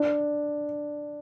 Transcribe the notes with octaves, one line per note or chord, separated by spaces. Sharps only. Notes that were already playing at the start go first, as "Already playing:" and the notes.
Already playing: D4